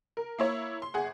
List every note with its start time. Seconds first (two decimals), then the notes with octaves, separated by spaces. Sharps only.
0.17 A#4
0.39 A#3 E4 C#5
0.82 C6
0.94 G1 G#4 F#5